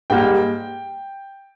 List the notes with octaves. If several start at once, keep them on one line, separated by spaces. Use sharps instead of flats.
G#2 G3 A#3 G5